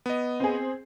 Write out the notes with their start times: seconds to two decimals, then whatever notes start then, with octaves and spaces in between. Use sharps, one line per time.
0.06 B3 D#5
0.40 C4 G#4